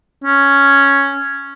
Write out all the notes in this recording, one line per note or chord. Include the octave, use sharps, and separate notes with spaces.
C#4